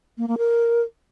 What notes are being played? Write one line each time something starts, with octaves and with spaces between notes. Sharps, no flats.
A#3
A#3
A#4